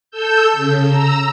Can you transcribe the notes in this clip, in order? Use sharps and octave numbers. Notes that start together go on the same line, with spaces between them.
A4 E6 G6
C#3
A#5 E6